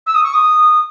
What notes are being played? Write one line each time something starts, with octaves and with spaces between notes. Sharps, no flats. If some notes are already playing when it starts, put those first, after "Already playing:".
E6
D#6
C#6
D#6